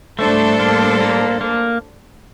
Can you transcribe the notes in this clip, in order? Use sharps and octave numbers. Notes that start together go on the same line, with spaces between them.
A2 G3 A3 D4 A4 C5
A#3
A#3
A#3